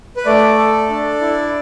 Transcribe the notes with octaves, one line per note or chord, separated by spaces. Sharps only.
B4
A3 D5
A4
D4
E4